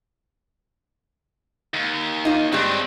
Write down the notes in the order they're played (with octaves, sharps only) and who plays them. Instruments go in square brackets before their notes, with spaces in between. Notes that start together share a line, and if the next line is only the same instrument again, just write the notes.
[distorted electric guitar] D#2
[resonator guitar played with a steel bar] D#4 F4
[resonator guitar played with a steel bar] G2 G3 G#3 [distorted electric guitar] C4 D4